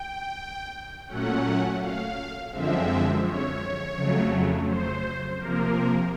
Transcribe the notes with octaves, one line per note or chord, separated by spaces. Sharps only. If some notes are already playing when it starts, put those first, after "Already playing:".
Already playing: G5
A#2 F#3 A3 C#4 F#5
F5
F#2 D3 F3 G#3 C4 E5
C#5
F2 C#3 F#3 A3
C5
C3 F3 A#3 A#4